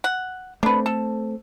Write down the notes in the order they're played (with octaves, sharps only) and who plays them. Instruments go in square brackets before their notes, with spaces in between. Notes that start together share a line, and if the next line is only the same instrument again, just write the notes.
[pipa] F#5
[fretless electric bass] A3 C4 [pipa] D4 B4
[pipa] A4